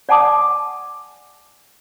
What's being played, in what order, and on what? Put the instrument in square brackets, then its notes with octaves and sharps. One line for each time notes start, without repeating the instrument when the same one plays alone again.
[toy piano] D5 F#5 G#5 A5 D6 D#6